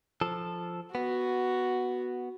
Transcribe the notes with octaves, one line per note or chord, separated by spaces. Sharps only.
F3 A4
B3 F#4